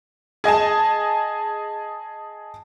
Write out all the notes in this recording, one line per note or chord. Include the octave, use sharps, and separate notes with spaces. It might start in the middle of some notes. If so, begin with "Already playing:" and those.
G#4 D#5 G#5 A5